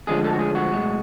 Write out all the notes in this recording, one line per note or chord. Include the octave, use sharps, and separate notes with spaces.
D2 D3 F3 G#3 G#4
A4
F#4
G#4
F#4
B1 A2 G#3